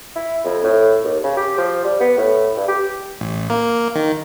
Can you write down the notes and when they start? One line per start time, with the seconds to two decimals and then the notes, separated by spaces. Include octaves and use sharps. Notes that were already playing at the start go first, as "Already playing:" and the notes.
0.16 E4
0.44 F2
0.64 A2
1.04 D#2
1.23 C#3
1.37 G4
1.58 F3
1.84 G3
2.00 B3
2.17 A2
2.56 G2
2.68 G4
3.21 A1
3.50 A#3
3.95 D#3